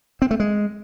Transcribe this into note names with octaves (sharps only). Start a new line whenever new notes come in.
C4
A3
G#3